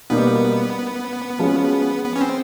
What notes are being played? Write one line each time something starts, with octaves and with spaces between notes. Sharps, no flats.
B2 G3 A#3 B3 D#4 G4
F3 G#3 C#4 F#4
B3
C#4
C4